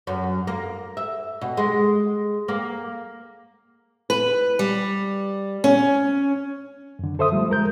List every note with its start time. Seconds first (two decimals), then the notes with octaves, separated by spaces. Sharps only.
0.07 F#2
0.47 A#3
0.97 E5
1.41 B2
1.57 G#3
2.48 A#3
4.10 B4
4.59 G3
5.64 C#4
6.99 F#2 D3
7.19 A4 C5 E5 D#6
7.32 F3 G3 A3
7.50 G#3 A#4 G6